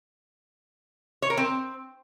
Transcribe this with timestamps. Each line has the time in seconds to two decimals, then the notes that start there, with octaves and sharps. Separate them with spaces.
1.22 C#5
1.30 A#4
1.37 C4